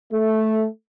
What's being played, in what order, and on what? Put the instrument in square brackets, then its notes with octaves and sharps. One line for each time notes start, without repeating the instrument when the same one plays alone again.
[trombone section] A3